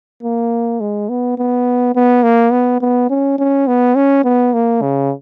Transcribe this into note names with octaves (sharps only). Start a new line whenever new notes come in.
A#3
G#3
B3
B3
B3
A#3
B3
B3
C#4
C#4
B3
C#4
B3
A#3
C#3